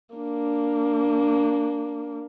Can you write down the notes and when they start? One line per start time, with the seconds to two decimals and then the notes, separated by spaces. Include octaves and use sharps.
0.16 A#3 D4